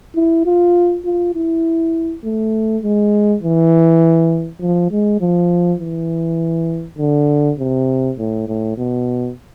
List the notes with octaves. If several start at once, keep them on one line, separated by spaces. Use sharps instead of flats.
E4
F4
F4
E4
A3
G#3
E3
F3
G#3
F3
E3
D3
C3
A2
A2
B2